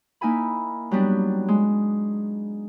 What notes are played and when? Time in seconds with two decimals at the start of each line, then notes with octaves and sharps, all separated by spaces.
0.21 A#3 D#4 E4 G#5 B5
0.91 F#3 G3 B3 D4
1.48 G#3